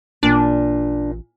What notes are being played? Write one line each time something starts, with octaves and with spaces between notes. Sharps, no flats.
A1 A#2 D4